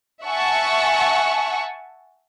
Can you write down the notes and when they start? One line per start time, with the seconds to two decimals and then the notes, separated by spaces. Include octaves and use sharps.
0.24 E5 F#5 G#5 A5 C#6